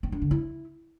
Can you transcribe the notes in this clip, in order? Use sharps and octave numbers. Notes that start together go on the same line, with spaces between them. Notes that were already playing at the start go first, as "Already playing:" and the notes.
C4
D4
D3
E4